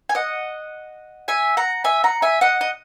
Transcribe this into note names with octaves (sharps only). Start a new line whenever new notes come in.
G#5
D#5 F#5
E5 G#5
F#5 A#5
E5 G#5
F#5 A#5
E5 G#5
D#5 F#5
D#5